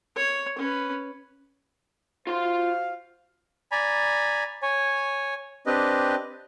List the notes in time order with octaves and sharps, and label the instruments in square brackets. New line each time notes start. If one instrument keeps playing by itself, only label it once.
[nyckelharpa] C#5
C#4 B4
[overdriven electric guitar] F4 C6 [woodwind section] F#4 C5 F5
[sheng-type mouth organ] D5 G#5 A#5 B5
C#5 G#5
C4 D4 G4 B4 D#5